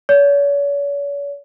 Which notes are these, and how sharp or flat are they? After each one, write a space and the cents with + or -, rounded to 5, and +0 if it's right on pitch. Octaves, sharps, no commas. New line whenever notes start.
C#5 +40